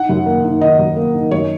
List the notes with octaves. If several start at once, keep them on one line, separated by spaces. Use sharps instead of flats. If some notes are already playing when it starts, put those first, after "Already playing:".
Already playing: D#4 F#5
F#2
A#3
D#3
D#4 D#5
F#2
A#3
D#3
F#2 C#5